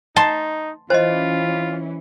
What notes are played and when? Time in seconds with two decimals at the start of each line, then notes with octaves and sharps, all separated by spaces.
0.16 D#4 A5 C6
0.90 E3 C#4 F4 C5 D#5